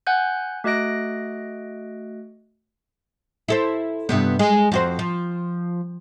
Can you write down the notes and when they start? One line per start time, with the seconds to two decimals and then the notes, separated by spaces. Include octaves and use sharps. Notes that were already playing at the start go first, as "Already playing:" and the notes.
0.07 F#5 G#5 F#6 G6
0.64 A3 F#4 D#5 F#6 A#6 D7
3.48 E4 A4 C5
4.09 G2 C3 B3
4.39 G#3 G#4
4.72 F2 F#4 C5
4.99 F3